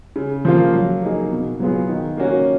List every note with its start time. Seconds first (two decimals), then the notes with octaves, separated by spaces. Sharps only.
0.16 C#3
0.45 F3 A#3 F4
0.74 F#3
1.02 A#3 D#4 G#4
1.32 B2
1.60 F#3 B3 F4 G#4
1.88 D#3
2.17 A#3 C#4 F#4